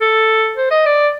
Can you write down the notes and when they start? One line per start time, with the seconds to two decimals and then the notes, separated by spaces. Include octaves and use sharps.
0.01 A4
0.57 C5
0.71 D#5
0.86 D5